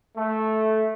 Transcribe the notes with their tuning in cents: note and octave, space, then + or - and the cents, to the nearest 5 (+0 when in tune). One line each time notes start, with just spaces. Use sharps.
A3 -10